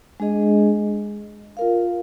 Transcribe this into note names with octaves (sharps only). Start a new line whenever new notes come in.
G#3 D4 G#4 D#5
F4 A#4 F5